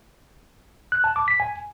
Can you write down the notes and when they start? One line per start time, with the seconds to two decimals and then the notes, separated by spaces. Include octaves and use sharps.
0.92 F#6
1.04 A5
1.16 D6
1.28 B6
1.40 G#5